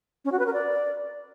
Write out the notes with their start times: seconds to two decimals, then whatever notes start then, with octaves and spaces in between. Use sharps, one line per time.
0.25 C#4
0.32 F#4
0.39 B4
0.46 A#4
0.53 D5